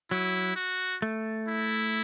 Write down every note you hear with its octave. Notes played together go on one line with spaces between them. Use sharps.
F#3 E4
F#4
A3
E4